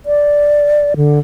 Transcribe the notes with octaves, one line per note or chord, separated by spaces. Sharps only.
D5
D3